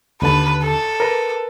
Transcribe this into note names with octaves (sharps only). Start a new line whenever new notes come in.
D#2 D3 B4 A5
A4
A#4 B4